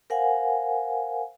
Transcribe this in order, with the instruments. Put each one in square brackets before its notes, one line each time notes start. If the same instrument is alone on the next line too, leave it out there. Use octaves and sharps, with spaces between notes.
[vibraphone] A#4 C5 F5 F#5 G#5